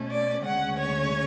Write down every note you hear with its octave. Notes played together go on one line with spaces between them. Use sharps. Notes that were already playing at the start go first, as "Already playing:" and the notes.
Already playing: B2 A3 C#4
D5
D2 C#3 G#3 C#4 F#5
C#5